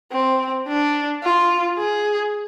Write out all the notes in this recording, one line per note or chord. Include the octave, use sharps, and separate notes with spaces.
C4
D4
F4
G#4